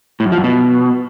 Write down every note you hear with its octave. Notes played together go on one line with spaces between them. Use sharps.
A2
F#2
F3
F#2
B2